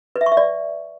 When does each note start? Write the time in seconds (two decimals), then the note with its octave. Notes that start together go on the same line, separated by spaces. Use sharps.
0.16 B4
0.21 E5
0.26 C#6
0.32 E5
0.37 D5